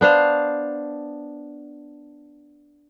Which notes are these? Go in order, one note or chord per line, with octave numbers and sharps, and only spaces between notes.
B3 D4 C5 F5